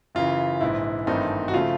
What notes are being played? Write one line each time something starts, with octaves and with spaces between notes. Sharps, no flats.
F#2 C#3 E3 F4
A#1 G#2 E3 E4
G#1 G2 E3 A3 C4 D#4
F#4
C#3 F3 A3 F4